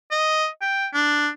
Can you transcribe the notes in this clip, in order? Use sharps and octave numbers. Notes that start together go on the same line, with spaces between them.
D#5
G5
D4